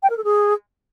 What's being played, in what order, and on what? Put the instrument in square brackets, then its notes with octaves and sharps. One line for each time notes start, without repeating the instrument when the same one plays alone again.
[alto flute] G5
A#4
A4
G#4